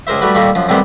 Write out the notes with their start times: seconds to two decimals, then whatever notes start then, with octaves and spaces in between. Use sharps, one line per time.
0.07 C#2 G#4 A#4 C5 E5
0.21 G3 A3 F#4 B4
0.35 A#2 D#3 G3 A3 A#3
0.55 F#2 F3
0.69 C2 A2 D#3 G3 B3 C4